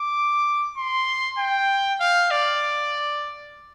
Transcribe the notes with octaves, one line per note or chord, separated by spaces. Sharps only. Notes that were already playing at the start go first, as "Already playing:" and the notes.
Already playing: D6
C6
G5
F5
D5